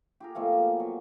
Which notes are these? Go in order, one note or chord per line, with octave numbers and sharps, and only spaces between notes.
G4 G#4 A#4
B2 F3 A3 A#3
G#5
F#3